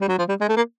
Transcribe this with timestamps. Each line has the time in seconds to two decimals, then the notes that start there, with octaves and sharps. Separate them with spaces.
0.01 G3
0.09 F#3
0.19 F3
0.29 G3
0.41 G#3
0.49 A3
0.57 A#3